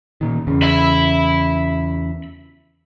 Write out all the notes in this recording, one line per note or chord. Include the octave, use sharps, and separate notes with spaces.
A#2 D#3
E2 C#3
E5 B5